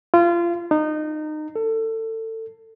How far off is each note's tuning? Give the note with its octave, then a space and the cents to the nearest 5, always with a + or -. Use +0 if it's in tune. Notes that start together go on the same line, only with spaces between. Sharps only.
F4 -25
D#4 -25
A4 +25